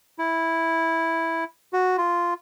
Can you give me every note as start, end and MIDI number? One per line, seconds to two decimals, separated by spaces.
0.19 1.44 64
1.73 1.97 66
1.98 2.34 65